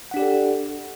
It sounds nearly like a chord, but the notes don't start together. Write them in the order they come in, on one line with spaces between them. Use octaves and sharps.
F#5 D4 G4 D5 A4